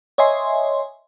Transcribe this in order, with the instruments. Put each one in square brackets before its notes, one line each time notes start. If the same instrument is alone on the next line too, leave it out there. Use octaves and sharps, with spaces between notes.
[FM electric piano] C#5 D#5 E5 G#5 C6